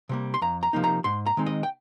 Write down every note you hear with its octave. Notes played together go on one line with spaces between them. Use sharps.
C3 G3 A#3
C6
F2 A#5
A#5
C3 F3 A#3 D#4
A#5
G#2 C6
A#5
D#3 G#3 C4 D#4
D#5
G5